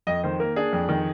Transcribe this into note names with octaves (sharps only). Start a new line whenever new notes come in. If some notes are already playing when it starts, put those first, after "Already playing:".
F2 D#5
D#3 C5
A#3 A#4
D4 G#4
F2
D#3